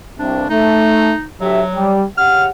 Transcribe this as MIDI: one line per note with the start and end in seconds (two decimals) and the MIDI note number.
0.19 0.47 36
0.19 0.47 43
0.19 0.47 48
0.19 0.48 62
0.50 1.12 57
0.50 1.27 63
1.41 1.62 38
1.41 2.04 54
1.41 1.62 67
1.41 1.62 76
1.75 2.04 55
2.18 2.47 49
2.18 2.47 67
2.18 2.47 78
2.18 2.44 89